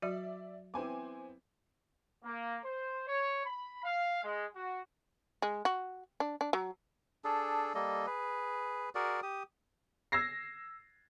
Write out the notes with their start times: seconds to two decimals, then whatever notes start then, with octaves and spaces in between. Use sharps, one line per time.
0.02 F#3 F#4 D5 E5
0.74 B3 C4 E4 C5 G#5 D6
2.24 A#3
2.64 C5
3.08 C#5
3.45 B5
3.84 F5
4.22 G#3
4.55 F#4
5.42 G#3
5.65 F#4
6.20 D4
6.41 D4
6.53 F#3
7.24 D4 G#4 A4
7.75 G3 A#3 A4 D#5
8.06 G#4 B4
8.95 F#4 G#4 A#4 D5
9.23 G4 D#6
10.12 E6 G#6 A#6 C7